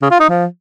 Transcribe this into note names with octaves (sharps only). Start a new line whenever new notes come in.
C#3
F4
D#4
F3